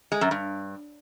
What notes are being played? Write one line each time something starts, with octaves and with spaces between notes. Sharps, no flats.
G#3
F#2
G2